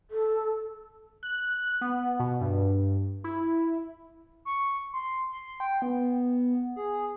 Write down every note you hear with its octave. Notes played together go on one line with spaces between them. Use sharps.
A4
F#6
B3
B2
G2
E4
C#6
C6
C6
G5
B3
G#4